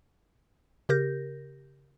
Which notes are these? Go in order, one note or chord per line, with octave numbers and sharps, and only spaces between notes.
C#3 G4 A#4 G6 A#6